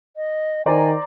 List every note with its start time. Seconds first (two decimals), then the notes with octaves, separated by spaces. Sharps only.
0.16 D#5
0.66 D#3 C5 D5 G#5 A#5